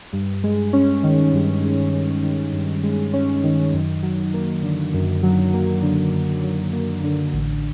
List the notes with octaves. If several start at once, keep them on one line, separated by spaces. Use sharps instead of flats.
G2
G#3
C#4
D#3
G2
G#3
C#4
D#3
G2
G#3
C#4
D#3
F#2
F#3
A#3
D3
F#2
F#3
A#3
D3
F#2
F#3
A#3
D3
A1